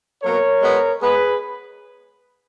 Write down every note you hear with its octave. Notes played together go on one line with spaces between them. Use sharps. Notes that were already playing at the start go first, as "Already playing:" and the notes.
B2 F#3 A#3 A#4 C#5
B2 G#3 B3
G#3 B3 G#4 B4